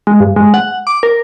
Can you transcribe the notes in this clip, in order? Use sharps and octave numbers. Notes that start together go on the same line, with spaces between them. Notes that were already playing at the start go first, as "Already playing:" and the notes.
G#3
G2
G#3
F#5
D6
A#4